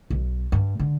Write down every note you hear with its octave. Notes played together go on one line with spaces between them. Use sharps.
B1
G2
D3